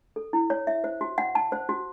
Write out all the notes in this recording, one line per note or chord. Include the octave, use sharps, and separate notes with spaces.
A4
E4
C#5
E5
C5
F#4
F#5
A5
C5
F#4